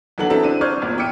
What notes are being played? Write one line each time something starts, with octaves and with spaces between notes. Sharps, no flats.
B1 D3 E3 A4 F#5 F#7
F#3 B3 C4 D4 E4 A4
C4 D4 D#7
C5 D5 C#6 F6 F#6 G#6
G#1 E2 A#2
E4 G5 D6 E6 C#7 D#7